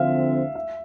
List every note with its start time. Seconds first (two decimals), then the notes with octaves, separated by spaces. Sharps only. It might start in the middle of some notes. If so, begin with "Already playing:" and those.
Already playing: D3 F3 C4 E5 F5
0.55 E5